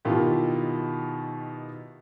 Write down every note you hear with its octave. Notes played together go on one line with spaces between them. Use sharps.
B2 D#3 E4 F4 G4